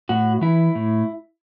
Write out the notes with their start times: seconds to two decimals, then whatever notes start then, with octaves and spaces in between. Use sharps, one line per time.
0.09 A2 F#4
0.41 E3 E4
0.75 A2